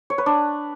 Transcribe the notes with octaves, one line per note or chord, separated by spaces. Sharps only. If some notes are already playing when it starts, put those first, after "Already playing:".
C#5
B4
D4